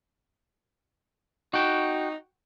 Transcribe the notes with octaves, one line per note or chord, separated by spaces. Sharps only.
D#4 F#4 G5